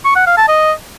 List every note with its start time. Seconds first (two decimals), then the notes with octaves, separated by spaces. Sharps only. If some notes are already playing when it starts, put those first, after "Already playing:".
0.05 C#6
0.16 F#5
0.27 F5
0.38 A5
0.48 D#5